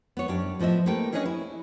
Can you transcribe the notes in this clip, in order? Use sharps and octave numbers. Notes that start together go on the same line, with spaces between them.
B3 C#5
F#2 D4 G4
A2 F3 B3 D#5 E5
A3 A#3 G4 B4 G5
C#4 D4 G#4 B4 C#5 D#5
E4